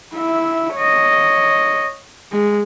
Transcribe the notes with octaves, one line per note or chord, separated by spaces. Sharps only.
E4 E5
C#5 D#5
G#3